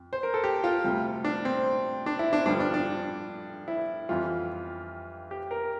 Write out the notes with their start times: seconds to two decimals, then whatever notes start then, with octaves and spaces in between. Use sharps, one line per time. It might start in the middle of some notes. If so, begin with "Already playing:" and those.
Already playing: F2
0.13 C5
0.23 A#4
0.34 A4
0.44 G4
0.64 F4
0.84 D2 C3 G3
1.24 D4
1.45 C4
2.06 D4
2.19 E4
2.33 D4
2.46 G2 D3 F3 D4
2.60 D4
2.74 D4
3.68 E4
4.09 F2 E3 G3 F4
5.31 G4
5.51 A#4